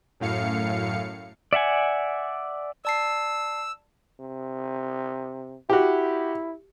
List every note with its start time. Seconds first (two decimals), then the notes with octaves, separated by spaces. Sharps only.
0.20 F#2 A2 F5 C#7
1.53 D5 E5 F#5 G#5
2.85 D5 A5 E6 C7
4.20 C3
5.70 E4 F#4 G4